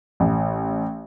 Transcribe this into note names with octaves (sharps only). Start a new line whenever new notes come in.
A1